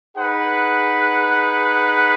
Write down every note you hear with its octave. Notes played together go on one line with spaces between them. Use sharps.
D#4 G#4 B4 F#5